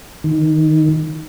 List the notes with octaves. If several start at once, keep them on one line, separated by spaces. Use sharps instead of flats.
D#3